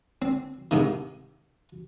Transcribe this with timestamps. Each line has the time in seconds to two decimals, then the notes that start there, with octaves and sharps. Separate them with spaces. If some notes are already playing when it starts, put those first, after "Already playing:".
0.22 C4
0.71 G#2 C3 D#3